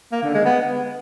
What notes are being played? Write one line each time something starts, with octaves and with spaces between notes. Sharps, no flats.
A#3
D3
G#3
B3